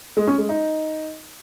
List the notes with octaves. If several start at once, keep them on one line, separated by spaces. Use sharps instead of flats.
G#3
C#4
G#3
D#4